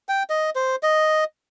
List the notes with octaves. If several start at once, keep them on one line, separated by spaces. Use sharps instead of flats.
G5
D#5
C5
D#5